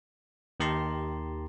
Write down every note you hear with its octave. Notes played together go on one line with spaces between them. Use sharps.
D#2 D#3 G4 A5 A#5 C6